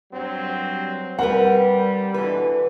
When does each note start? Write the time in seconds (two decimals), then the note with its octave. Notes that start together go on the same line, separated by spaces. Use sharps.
0.11 G2 F#3 C4
1.19 G3 C4 A#4 B4 F#5
2.14 B2 D3 E3 B4